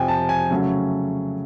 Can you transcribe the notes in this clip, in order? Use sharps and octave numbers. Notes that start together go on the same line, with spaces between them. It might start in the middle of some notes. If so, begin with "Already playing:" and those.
Already playing: F2 C3 F3 G5 G#5
A5
G#5
C#3 F#3 A3 C#4